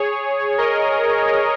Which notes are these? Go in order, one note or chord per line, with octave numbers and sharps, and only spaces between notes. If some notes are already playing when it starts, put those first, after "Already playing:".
Already playing: G#4 C#5
A#4 D#5